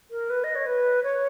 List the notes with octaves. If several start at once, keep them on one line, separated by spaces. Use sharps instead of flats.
A#4
B4
D#5
C#5
B4
C#5